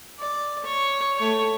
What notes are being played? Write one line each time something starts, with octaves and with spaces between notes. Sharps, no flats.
D5
C#5
A3 C#5